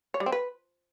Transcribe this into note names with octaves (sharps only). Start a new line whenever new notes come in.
C#5
G3
C4
B4